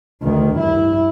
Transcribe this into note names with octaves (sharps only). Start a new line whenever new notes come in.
D2 D#3
G2 E4